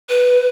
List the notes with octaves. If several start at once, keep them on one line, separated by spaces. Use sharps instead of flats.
B4